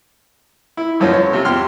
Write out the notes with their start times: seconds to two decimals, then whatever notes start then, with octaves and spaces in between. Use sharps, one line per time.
0.77 E4
1.00 B1 F#2 F3 C#4 C5
1.13 C#5
1.33 C3 F4
1.45 E2 G4 C6 F6